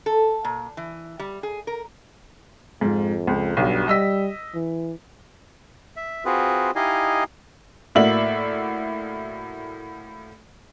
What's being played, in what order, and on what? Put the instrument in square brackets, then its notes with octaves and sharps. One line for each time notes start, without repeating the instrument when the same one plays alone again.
[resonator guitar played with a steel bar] A4
A#2
E3
G3
G#4
A#4
[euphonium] F2 [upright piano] G#2 F4
[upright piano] C#2
[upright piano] B1 B2 [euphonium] G2
[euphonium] G3 [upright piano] D#5 E6 B6
[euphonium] E3
[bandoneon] E5
C4 F4 F#4 G#4 B4
D#4 E4 G4 D#5 F5 G#5
[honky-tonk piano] A2 A#3 F#4 D5 E5 F#7